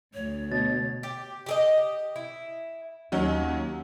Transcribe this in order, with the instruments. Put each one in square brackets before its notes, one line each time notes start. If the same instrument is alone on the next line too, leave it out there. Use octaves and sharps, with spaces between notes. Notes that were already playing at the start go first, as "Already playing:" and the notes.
[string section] D2 [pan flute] C#5
[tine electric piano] B2 [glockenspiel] A6
[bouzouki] G4
G4 G#4 D#5
E4
[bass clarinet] D#2 [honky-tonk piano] D#3 F#3 C#4